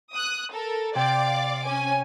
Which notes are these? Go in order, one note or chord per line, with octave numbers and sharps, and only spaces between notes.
D#6 F#6
A4 A#4
C3 D5 F5 G5 D6
C#4 G#5